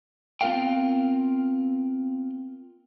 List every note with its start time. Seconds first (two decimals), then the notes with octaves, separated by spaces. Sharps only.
0.41 B3 C4 F4 A#4 F5 G5